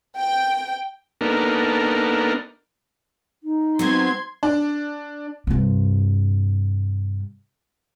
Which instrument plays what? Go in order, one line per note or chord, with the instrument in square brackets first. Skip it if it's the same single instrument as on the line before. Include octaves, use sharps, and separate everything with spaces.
[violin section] G5
[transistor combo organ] A#3 B3 D4 D#4 A4 A#4
[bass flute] D#4
[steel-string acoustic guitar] F#3 B3 C4 [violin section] C6 G#6
[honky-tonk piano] D4
[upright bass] G2 C3